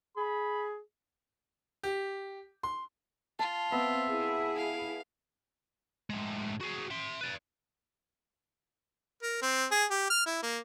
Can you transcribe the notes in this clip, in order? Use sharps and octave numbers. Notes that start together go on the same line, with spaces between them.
G#4 B5
G4
C6
F4 A5
B3 C4 E5
E4 G#4
F5
A2 G#3
F#4 G#4
E5 C6
B4 D5
A#4
C4
G#4
G4
F6
E4
A#3